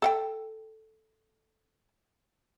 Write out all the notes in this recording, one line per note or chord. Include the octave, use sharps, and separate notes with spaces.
A4 F#5 G5